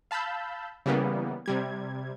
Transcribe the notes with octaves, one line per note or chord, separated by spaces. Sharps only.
F5 A5 B5 E6 G6
C#3 E3 G3 A#3 B3
C3 G3 G#6